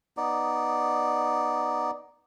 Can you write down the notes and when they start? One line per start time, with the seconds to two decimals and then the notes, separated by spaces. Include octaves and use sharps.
0.17 B3 D#4 D5